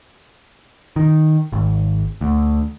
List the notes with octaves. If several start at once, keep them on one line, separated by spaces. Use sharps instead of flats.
D#3
G#1
D2